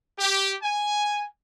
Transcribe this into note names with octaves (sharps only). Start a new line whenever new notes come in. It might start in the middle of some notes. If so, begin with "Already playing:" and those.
G4
G#5